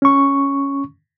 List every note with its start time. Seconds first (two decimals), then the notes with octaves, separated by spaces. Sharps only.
0.02 C#4 C#6